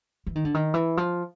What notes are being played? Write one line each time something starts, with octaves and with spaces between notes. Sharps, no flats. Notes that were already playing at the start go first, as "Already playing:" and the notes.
E3
D#3
D3
D#3
E3
F3